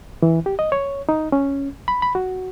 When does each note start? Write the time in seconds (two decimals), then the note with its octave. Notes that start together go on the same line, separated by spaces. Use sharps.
0.22 E3
0.46 G4
0.59 D#5
0.72 C#5
1.09 D#4
1.32 C#4
1.88 B5
2.02 B5
2.15 F#4